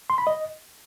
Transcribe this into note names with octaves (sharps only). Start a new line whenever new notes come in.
C6
B5
D#5